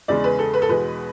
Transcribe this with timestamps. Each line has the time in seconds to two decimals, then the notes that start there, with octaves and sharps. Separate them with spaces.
0.08 E2 C#3 G#3 C#4 D5
0.24 B4
0.39 A4
0.54 B4
0.62 A4
0.69 E2 B2 G#3 B4